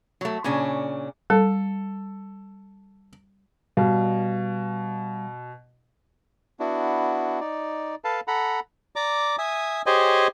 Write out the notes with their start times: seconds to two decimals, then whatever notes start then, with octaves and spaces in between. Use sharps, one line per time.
0.21 F#3 A3
0.44 A#2 C#3 C#4 D4
1.30 G3 A4
3.77 B2 G3 F5
6.60 B3 D4 E4 F#4
7.40 D#4 D5
8.04 A4 B4 F5 A5
8.28 A4 F#5 A#5 B5
8.96 D5 A#5 D6
9.38 E5 G#5 D#6
9.86 G4 G#4 C5 C#5 D#5 G#5